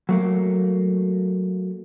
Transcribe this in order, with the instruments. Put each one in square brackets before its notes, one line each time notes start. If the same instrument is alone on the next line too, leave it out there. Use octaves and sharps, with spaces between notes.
[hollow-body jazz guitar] F#3 A3 A#3